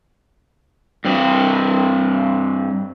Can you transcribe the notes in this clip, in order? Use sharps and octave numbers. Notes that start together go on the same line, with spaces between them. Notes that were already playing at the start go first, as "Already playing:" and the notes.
G2 C4